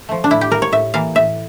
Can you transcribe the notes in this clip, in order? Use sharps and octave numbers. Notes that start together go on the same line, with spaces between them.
F3 A3
D4
A2 E4
G4
G3 A#3 A#4
C#5
A2 E5
E3 A#3 F5
A2 E5